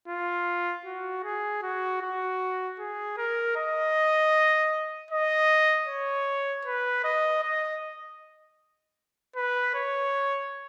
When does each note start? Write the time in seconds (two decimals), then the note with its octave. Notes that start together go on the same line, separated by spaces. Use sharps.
0.08 F4
0.85 F#4
1.24 G#4
1.62 F#4
2.01 F#4
2.79 G#4
3.18 A#4
3.56 D#5
5.11 D#5
5.88 C#5
6.65 B4
7.04 D#5
7.43 D#5
9.36 B4
9.75 C#5